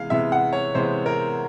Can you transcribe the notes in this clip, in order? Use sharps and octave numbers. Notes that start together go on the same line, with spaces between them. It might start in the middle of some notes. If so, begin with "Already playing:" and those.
Already playing: C3 E3 G#3 B3 F5
C3 E3 G#3 B3 E5
F#5
C#5
C3 E3 G#3 B3 C5
A#4